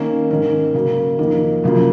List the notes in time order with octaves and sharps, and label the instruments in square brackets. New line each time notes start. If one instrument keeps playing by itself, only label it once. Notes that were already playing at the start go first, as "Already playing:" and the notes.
Already playing: [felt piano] D#3 A#3 C#4
G#2 D#3 A#3 C#4
C#3 F#3 A#3
F2 D#3 A#3
F#2 C#3 F3 A#3